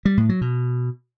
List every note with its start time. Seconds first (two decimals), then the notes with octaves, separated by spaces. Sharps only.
0.05 G3
0.17 A2
0.29 F#3
0.41 B2